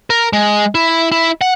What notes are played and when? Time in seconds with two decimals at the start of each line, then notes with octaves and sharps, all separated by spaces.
0.10 A#4
0.33 G#3
0.75 E4
1.12 E4
1.41 F#5